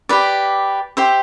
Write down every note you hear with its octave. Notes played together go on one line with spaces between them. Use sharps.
G4 B4 D5
G4 C5 E5